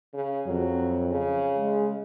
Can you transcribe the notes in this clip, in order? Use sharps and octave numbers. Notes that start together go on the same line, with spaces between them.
C#3
F2 F#3
C#3
G#3